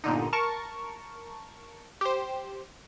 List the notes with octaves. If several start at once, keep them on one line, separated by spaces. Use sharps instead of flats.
G1 A#2 D3 D#4
A#4 A5 C#6
G4 C5